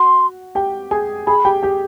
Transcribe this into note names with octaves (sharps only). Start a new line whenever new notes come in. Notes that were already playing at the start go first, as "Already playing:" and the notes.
Already playing: F#4 F#5 C6
G4 G5
G#4 G#5
G#4 G#5 B5
G4 G5
G4 G5